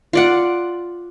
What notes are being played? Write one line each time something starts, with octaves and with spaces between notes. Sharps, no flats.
F4 D5 F#5